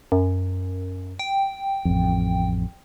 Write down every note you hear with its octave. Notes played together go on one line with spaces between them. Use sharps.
F#2
G5
A1 F2